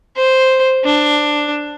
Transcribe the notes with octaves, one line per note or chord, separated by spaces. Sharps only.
C5
D4